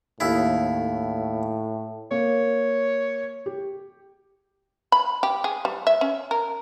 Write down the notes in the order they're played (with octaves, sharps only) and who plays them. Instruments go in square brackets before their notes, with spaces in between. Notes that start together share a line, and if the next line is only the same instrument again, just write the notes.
[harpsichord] D#2 E4 [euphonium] A2
[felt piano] A#3 [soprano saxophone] C#5
[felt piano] G4
[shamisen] B5
G4
G#4
G3
E5
C#4
A#4